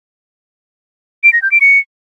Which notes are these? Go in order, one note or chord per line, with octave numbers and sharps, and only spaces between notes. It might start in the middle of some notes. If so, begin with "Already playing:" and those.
D7
A#6
G6
D7
C#7